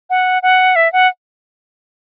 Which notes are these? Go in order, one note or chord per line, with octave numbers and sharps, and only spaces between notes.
F#5
F#5
E5
F#5